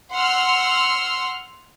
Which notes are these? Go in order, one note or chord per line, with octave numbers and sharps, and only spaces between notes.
F#5 C6 E6 F6